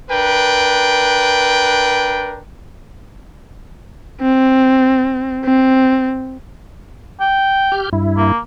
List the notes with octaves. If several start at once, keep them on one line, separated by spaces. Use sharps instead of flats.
D4 A#4 B4 G5
C4
C4
G5
G4 F6 G6
G2 E4
A#3